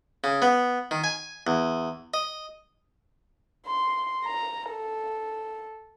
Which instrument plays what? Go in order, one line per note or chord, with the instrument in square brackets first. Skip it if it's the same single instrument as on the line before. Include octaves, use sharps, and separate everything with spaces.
[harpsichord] C#3
B3
D#3
G#5
E2
D#5
[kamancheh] C6
A#5
A4